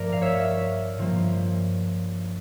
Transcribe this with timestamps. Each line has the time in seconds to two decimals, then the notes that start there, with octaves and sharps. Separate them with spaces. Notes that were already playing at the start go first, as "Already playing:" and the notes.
Already playing: G2 F3 A3 A#4 D5
0.12 F5
0.21 C#5 E5
0.98 G2 F3 A#3